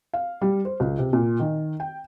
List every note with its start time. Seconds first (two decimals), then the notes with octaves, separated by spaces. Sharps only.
0.14 F5
0.42 G3
0.65 C5
0.80 C#2
0.98 C3
1.13 A#2
1.40 D#3
1.80 G5